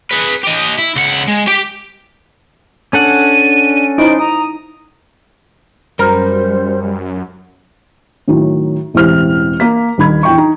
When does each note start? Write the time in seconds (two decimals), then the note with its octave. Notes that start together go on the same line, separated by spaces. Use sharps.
0.11 G#4 B4
0.44 G4 D#5
0.78 E4
0.95 C#2 F#5
1.28 G#3
1.47 G4 G5
2.93 C#4 D4 A4 F#5 D#7
3.98 D#4 E4 C5 D#5 D7
4.19 A#5 D#6
5.99 F#2 G3 A#4 C5
8.28 A2 D#3 F#3
8.94 E1 A1 E3 C4 G4 F6
9.60 A#3 B6
9.98 D#1 D#3 B5 G#6
10.23 E2 G5 C#6
10.38 D#4